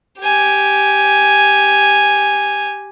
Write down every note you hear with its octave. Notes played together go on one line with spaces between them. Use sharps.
G4 G#5